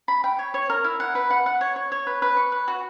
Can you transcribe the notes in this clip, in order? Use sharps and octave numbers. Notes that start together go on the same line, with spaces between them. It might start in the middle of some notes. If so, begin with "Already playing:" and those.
B5
G5
C#5
C#5
A#4
E4
F#5
B4
F#5
F#5
C#5
C#5
C#5
B4
B4
C#6
B4
F#4